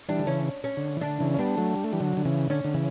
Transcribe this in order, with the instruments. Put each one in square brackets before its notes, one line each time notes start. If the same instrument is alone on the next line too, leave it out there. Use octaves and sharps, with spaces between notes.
[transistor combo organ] E3 G3 [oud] D4
[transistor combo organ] D3
[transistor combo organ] C#3 E3 [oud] C#4
[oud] C#4
[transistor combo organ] D3
E3
[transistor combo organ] D3 [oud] D4
[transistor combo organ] C#3 E3
C#4
[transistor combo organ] G3 B3 [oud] D4
[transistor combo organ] F#3 A3
G3
A3
E3 G3
D3 F#3
D3
C#3 E3
[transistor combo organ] D3 [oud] C#4
[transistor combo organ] D3
C#3 E3